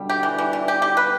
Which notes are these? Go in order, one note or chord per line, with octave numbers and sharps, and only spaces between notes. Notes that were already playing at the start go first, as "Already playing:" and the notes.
Already playing: B2 D3 G3
G4
E3
E3
E3
G4
G4
B4